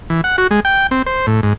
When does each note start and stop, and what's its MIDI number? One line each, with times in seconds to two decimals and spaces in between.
0.10 0.21 52
0.24 0.36 78
0.38 0.47 66
0.51 0.60 56
0.65 0.87 79
0.91 1.02 60
1.06 1.26 72
1.27 1.40 45
1.43 1.53 44